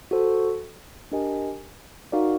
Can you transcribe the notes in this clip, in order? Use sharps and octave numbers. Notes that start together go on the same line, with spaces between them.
F#4 A4 C5
D4 G4 A#4 D#5 G#5
D#4 F#4 A#4 D5 F5